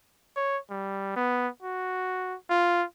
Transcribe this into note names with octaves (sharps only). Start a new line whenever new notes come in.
C#5
G3
B3
F#4
F4